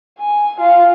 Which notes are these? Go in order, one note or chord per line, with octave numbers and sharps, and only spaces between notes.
G#5
F4